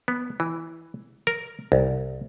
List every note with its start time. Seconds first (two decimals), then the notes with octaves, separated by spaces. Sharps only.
0.08 B3
0.40 E3
1.27 A#4
1.72 C2